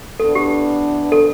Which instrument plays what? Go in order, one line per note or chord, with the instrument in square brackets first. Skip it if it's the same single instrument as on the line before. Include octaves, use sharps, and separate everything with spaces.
[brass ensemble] E3 B3 D4 [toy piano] A4
[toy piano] G4
A4